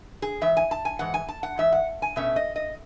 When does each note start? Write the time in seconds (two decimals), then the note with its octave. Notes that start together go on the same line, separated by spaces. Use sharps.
0.22 G#4
0.41 G#2 E3 E5
0.57 G#5
0.71 A5
0.85 G#5
0.99 G#2 E3 F#5
1.14 G#5
1.29 A5
1.43 F#5
1.58 G#2 E3 E5
1.72 F#5
2.02 G#5
2.16 B2 A3 C#4 E5
2.36 D#5
2.56 D#5